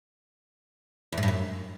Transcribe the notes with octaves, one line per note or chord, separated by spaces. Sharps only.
E2
G#2
G2
F#2